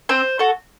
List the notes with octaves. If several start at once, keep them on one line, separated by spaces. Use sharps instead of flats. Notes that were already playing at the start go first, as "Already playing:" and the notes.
C4 C5
F#4 A4